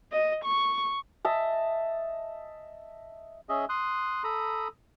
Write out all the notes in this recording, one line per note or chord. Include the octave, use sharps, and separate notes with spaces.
D#5
C#6
D#5 E5 A5
C#4 G#4 D#5 E5
C6 D#6 F#6
A4 A#5 B5 D#6